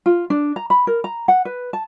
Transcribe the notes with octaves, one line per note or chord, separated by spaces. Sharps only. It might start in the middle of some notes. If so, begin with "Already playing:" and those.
F4
D4
A#5
B5
A#4
A#5
F#5
B4
A5